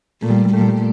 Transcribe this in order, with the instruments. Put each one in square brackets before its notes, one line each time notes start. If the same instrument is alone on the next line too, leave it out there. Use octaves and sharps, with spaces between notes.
[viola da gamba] A#2 [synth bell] A3
[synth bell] G3
G3
[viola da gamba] A#2 [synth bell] A3
[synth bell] G3
A3